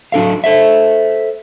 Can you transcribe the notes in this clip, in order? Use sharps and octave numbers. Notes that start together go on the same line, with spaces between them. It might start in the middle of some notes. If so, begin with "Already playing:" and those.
F#3 D4 A4 F5
A4 C5 E5